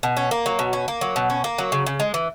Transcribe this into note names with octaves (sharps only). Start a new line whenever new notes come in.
B2
C#4
A#3
F#3
B2
C#4
A#3
F#3
B2
C#4
A#3
F#3
C#3
C#3
G#3
E3